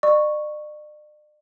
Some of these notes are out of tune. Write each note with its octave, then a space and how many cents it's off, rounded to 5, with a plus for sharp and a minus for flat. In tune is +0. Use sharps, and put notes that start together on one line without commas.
D5 +40 C#6 -5